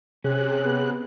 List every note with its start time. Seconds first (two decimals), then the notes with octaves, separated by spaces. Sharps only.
0.24 C3 C#4 G#4 F#6
0.64 B3